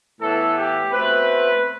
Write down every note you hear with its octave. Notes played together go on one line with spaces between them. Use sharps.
A2 E3 B3 A4
G4
B2 A3 C4 B4